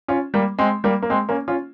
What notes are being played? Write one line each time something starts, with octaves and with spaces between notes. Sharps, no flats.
C#4 F4
G3 A#3
G#3 C4
G3 A#3
A#3
G#3 C4
A#3 C#4
C#4 F4